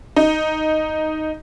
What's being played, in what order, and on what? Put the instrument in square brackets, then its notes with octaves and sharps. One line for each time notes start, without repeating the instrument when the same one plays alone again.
[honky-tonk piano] D#4